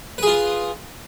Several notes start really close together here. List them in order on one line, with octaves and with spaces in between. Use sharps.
B4 G#4 F4